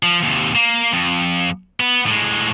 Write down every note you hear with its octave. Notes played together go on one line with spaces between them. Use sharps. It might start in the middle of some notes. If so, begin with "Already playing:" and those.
F3
D#2 C3
A#3
F2
B3
A2 G#3